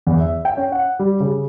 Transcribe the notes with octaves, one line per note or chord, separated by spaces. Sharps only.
E2
E5
G5
C#4
F#5
G3
C#3